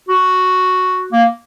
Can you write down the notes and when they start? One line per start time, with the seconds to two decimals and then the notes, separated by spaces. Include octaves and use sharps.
0.09 F#4
1.12 A#3